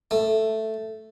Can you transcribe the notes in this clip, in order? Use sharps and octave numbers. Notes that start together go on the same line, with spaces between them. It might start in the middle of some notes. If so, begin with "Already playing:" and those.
A3